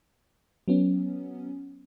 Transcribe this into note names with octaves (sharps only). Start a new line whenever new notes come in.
F#3 B3 C#4